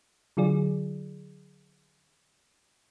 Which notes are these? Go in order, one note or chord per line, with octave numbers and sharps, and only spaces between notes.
D3 F#3 F4 G#4 D5